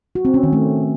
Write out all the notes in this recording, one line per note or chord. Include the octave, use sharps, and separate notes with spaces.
F#4
C4
C#4
D#3
A3